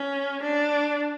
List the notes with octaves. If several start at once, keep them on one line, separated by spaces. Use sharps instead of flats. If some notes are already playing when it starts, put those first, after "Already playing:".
Already playing: C#4
D4